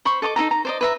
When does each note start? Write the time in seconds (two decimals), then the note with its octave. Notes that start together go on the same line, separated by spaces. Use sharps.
0.05 C5 B5 C#6
0.22 A4 D#5 C#6 D6
0.36 D#4 F4 A4 A#5
0.51 A#5
0.65 C5 D5 D#5
0.81 B4 E5 A#5